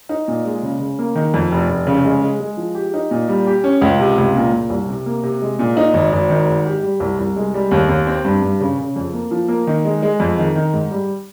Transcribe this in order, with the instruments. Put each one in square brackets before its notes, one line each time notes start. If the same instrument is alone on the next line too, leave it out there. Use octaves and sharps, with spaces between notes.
[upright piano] D#4
A#2
G#3
C#3
C#3
A#3
D#3
F2
F1
F1
C#3
G#3
G#3
G#3
F3
G4
D#4
A#2
G3
G4
C#4
C#2
C3
C#2
A#2
A#2
C2
C3
A#3
C3
G#3
A#2
D#4
G#1
G#1
D#3
G#2
G4
G3
C2
C2
G#3
G3
D#2
D#2
C4
G2
G2
C#3
C#3
F2
A#3
F3
A#3
D#3
G#3
G#3
F2
D#3
D#3
G#2
G3